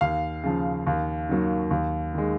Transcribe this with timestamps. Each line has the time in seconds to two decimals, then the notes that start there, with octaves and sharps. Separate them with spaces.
0.01 D#2 F5
0.43 C#3 F3
0.87 D#2
1.29 D#3 F#3 A#3
1.71 D#2
2.14 D#3 G#3